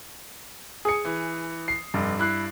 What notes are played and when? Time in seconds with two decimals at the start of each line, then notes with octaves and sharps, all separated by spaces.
0.85 G#4 G#5 D#6 C#7
1.05 E3
1.68 C7
1.94 F1 G2
2.19 E4 F#6 C7